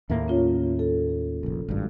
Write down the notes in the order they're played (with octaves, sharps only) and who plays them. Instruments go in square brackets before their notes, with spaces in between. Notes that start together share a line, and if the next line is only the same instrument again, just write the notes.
[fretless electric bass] D#2 A2 A#3 [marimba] E5
[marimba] C#4 F4 C#5
A4
[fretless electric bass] F1 A#1
G#1 G2